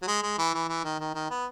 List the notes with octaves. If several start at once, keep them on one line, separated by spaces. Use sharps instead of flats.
F#3
G#3
G#3
E3
E3
E3
D#3
D#3
D#3
B3